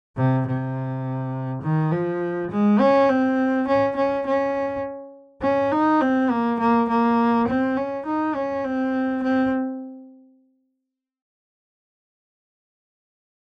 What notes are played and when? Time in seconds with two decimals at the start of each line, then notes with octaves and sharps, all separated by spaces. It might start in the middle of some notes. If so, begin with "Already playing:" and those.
0.17 C3
0.47 C3
1.63 D#3
1.92 F3
2.51 G#3
2.80 C#4
3.09 C4
3.68 C#4
3.96 C#4
4.26 C#4
5.42 C#4
5.72 D#4
6.01 C4
6.31 A#3
6.60 A#3
6.89 A#3
7.48 C4
7.77 C#4
8.06 D#4
8.35 C#4
8.64 C4
9.23 C4